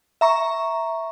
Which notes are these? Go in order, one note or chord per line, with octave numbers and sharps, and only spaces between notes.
E5 A#5 C#6